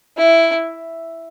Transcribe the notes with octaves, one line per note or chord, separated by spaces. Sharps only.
E4